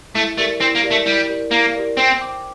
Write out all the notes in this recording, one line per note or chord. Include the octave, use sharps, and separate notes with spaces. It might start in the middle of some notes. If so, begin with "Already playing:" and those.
A3 E4
A3 G4 A#4 D5
C4 E4
A#3
G4 A#4 D5
A3
G3 E4
G4 A#4 D5
A#3 E4
G4 A#4 D5
C4 C5
G5 D6